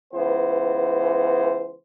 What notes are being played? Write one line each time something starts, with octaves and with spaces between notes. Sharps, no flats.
C#2 E3 B3 C5